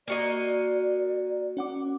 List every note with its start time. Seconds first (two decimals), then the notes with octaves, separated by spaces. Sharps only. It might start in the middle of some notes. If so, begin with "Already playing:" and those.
0.08 A#3 F#4 D5 D#5
1.57 C#4 F#5 D6